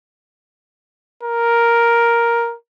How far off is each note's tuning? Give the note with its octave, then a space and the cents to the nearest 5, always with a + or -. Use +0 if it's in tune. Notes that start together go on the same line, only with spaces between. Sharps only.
A#4 +5